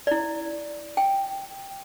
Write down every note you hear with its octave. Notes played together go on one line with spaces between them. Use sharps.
E4 D5
G5